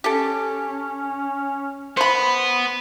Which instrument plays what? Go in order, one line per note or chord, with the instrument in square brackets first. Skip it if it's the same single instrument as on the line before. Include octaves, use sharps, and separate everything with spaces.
[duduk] C#4 [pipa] G4 A4
[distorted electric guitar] B3 [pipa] C5 B5